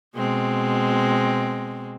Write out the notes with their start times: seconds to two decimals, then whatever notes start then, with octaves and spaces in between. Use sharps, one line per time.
0.16 B2 G#3 C4